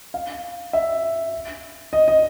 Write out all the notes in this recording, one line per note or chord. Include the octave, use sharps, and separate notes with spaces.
F5
E5
D#5
D#5